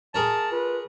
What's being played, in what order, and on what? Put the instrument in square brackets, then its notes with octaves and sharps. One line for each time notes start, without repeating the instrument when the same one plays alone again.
[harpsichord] G#4 A#4 C#5 [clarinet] A5
[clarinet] F4 [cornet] B4